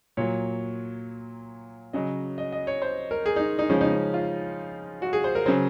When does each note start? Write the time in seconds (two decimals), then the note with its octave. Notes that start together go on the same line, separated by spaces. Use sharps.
0.17 A#2 F#3 C#5
1.93 C#3 F#3 D#5
2.38 D#5
2.53 D#5
2.67 C#5
2.82 C5
3.11 A#4
3.26 G#4
3.36 D#4
3.59 D#4
3.70 C#3 F3 G#3 C#4
3.81 D#4
3.92 C#4
4.14 F4
5.02 F#4
5.13 G#4
5.24 C5
5.35 A#4
5.46 C#3 F#3 C5